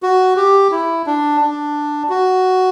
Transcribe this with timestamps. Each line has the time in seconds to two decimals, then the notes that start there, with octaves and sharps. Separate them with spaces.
0.03 F#4
0.37 G4
0.71 E4
1.06 D4
1.41 D4
2.09 F#4